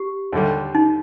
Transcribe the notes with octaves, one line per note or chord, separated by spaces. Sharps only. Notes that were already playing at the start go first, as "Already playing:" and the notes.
Already playing: G4
D#2 D3 G3
D#4